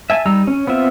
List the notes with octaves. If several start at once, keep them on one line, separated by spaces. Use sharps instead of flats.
E5 G#5 A5
G3 D#4 A#5 E6
C#4
B3 C4 F4 E5